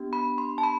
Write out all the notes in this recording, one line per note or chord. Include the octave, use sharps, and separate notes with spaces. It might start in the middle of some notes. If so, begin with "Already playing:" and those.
Already playing: B3 D4 G4
B5
C6
A5
B5